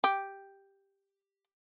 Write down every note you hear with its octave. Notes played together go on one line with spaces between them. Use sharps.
G4